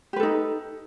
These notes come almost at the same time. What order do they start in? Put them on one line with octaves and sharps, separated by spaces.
G4 B4 A4 D#4